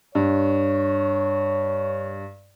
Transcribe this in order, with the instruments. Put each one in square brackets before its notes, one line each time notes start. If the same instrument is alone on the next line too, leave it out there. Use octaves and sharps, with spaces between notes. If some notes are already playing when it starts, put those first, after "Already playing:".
[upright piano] G2 [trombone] C#5